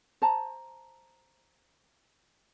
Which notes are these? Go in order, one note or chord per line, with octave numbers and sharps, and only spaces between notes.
C5 A5 A#5